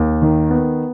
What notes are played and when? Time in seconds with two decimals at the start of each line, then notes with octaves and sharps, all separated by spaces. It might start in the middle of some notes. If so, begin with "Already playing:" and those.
Already playing: D#2
0.22 D#3
0.51 B3